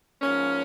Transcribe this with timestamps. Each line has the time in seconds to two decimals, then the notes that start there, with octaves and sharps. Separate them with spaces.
0.21 G#2 F3 A#3 C#4